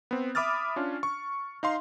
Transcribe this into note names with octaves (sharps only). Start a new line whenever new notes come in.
B3 C4
E5 B5 D6 D#6 F6 A6
C#4 D4 F4
C#6
D#4 F5 C6